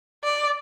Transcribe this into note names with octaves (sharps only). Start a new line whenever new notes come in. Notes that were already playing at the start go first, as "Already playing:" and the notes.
D5